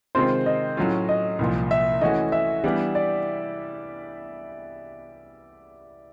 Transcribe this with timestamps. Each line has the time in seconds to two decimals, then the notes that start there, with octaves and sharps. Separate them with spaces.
0.15 C3 D#3 G#3 C4 F4 C5
0.46 D#5
0.77 A2 F#3 A3 C#4 F4
1.09 D#5
1.39 C2 A#2 F3
1.71 E5
2.01 E3 A3 C#4 F#4 D#5
2.32 E5
2.64 E3 G3 B3 D4 G4
2.95 D5